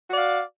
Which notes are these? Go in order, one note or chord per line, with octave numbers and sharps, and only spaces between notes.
F#4 D5 F5